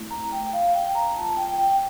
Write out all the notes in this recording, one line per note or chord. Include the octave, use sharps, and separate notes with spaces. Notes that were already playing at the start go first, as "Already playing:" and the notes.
Already playing: A3 C4 E4
A#5
G5
F5
G5
A#5
A#3 F4 A5
G5
G5